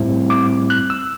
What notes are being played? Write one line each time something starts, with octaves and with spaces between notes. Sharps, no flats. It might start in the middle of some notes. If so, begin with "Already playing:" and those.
Already playing: A2 G3 C4 E4
D6
F#6
E6